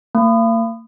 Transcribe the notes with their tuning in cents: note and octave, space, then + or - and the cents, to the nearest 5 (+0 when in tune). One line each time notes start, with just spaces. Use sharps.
A#3 -40